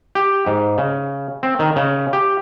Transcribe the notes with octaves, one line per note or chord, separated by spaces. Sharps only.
G4
G#2
C#3
C4
D#3
C#3
G4